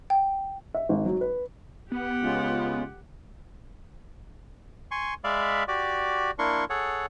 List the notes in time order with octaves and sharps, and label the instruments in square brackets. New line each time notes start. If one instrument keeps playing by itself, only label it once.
[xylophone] G5
[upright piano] E5
G#1
F#3
B4
[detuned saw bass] B3 [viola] G4 F#5
[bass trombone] C#2 [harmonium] G#3 C#4 F4
[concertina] G#5 C6 C#6
G#3 D5 E5 F5 B5
F#4 G4 D5
A#3 D4 E4 A#4 C6 C#6
G#4 A4 C#5 F#5